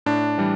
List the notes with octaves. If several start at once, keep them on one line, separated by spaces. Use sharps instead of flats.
A2 D4
E3 G3